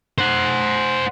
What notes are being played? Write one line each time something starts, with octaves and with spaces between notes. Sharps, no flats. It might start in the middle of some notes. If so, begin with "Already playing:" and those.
C5 F#5